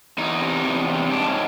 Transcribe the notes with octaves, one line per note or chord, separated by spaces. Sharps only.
E2 D#4
C3
E2
C3
G#2 D4
C#4